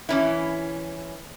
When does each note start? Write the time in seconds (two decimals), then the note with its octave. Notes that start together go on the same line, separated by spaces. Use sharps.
0.09 E3 C#4 E4